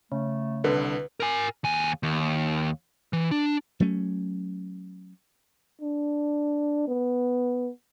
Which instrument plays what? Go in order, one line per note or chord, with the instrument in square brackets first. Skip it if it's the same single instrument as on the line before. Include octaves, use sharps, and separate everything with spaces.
[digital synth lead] C#3 [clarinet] A3
[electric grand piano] C2 D3 [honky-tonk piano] B4
[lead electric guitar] A#4 G#5
D#2 G#5
D#2
E3
D4
[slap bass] F#3 A3 C#4
[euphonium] D4
B3